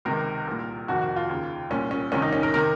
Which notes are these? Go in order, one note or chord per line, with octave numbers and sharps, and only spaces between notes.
C#2 C3 D#3 A#4
C2 A#2
F2 C3 D#3 F#4
F#4
F4
D#2 C#3
C2 A#2 C#4
C#4
C2 C3 D#3 C#4
D#4
C#4
A#4
C3 D#3 A#4